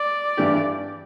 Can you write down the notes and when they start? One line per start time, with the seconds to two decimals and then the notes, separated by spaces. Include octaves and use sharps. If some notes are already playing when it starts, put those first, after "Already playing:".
Already playing: D5
0.37 G2 E3 A3 D4 G4